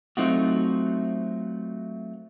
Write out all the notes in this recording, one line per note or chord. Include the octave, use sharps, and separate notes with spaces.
F#3 A3 C4 D#4 F4 F#4